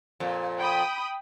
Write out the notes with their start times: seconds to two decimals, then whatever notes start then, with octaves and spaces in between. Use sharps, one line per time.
0.20 F2 A#2
0.58 G5 B5 D#6